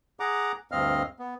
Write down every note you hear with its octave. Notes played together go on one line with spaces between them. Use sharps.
G#4 F#5 A#5 D6
D2 G2 C4 D#5 F5 F6
B3